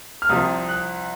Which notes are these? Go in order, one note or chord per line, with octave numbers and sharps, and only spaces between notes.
F6
C2 C3 F3 D#6
F#6